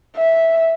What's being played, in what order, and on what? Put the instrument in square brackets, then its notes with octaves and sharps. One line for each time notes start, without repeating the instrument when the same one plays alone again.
[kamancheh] E5